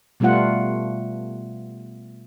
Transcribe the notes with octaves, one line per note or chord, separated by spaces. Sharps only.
B2 G3 A3 B3 F4 F#5